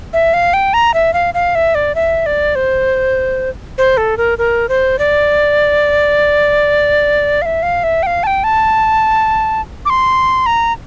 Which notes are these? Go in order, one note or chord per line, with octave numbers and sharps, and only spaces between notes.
E5
F5
G5
A#5
E5
F5
F5
E5
D5
E5
D5
C5
C5
A4
A#4
A#4
C5
D5
F5
E5
F5
E5
G5
F5
A5
G5
A5
D6
C6
A#5